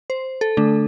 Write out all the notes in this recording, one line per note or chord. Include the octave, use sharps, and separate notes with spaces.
C5
A4
D3 A3 D4